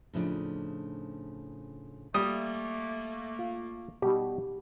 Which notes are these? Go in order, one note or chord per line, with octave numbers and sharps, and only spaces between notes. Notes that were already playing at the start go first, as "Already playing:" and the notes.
A2 C#3 F3 G#3 D4 D#4
G3 A3 A#3 D#6
F4
B2 G3 D#4 G4